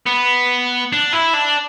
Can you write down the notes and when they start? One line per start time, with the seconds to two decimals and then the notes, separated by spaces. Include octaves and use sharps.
0.06 B3
0.92 D4
1.13 E4
1.34 D4